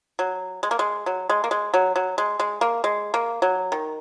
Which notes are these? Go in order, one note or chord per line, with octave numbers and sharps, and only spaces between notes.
F#3
G#3
A#3
G#3
F#3
G#3
A#3
G#3
F#3
F#3
G#3
G#3
A#3
G#3
A#3
F#3
D#3